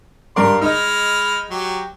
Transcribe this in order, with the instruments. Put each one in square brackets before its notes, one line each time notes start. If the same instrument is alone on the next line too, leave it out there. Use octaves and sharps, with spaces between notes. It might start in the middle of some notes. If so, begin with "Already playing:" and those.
[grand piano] G2 A#4 D5 [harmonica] C6
[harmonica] G#3 B5 F6 [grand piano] D#4
[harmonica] F#3 G4